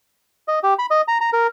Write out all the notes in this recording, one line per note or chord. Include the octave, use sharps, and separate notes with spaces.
D#5
G4
B5
D#5
A#5
A#5
A#4